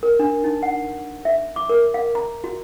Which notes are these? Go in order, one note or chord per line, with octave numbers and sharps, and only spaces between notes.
A#4
D4
D#4
F#5
E5
D6
A#4
F5
A#5
F#4